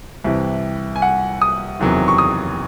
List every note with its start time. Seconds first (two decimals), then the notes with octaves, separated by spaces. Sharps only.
0.24 C2 C3 E3
0.96 G#5
1.02 F#5
1.42 D#6
1.79 F#1 E2 C3 D#3 F#3
2.08 C#6
2.18 D#6